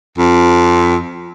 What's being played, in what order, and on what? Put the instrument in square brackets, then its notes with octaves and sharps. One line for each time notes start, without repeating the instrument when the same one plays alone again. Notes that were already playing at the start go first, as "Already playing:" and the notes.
[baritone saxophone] F2